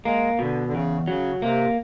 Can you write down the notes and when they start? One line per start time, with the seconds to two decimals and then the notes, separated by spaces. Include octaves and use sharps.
0.05 G#3 A#3
0.39 B2 D3
0.67 D3
0.73 E2 C#3
1.08 C#3 F#3
1.42 C3 A#3